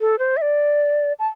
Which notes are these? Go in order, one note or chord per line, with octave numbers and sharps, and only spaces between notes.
A4
C5
E5
D5
A5